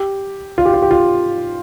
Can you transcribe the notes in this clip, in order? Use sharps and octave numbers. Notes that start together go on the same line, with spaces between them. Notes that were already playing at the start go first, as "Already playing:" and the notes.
Already playing: G4
F4
G4
F4
G4
F4